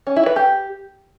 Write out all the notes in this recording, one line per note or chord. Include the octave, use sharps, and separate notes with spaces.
C#4
E4
B4
G4